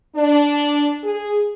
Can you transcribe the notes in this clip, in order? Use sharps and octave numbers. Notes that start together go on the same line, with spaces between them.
D4
G#4